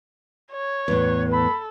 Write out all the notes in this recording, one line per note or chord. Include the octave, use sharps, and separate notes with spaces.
C#5
E2 A2 B4
A4 B5